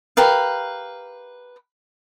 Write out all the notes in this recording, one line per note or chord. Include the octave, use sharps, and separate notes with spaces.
G4 A#4 B4 F5